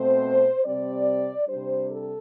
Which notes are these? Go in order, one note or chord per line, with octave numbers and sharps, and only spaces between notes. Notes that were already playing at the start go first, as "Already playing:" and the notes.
Already playing: B2 A3 C4 C5
C3 G3 C4 D5
C3 G3 D4 C5
A4